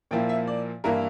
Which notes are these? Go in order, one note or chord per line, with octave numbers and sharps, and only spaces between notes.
A#2 F3 A#3 E4 G5
E5
D5
G2 E3 A#3 E4 A#4